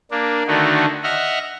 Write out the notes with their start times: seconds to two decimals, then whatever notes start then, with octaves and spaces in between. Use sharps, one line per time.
0.11 A#3 D4
0.47 D3 D#3 A3 D#4 F#4
1.03 D#5 E5 F#5 F6